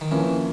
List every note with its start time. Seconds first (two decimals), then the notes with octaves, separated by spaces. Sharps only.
0.01 D#3
0.11 E3 F3 A#3 C#4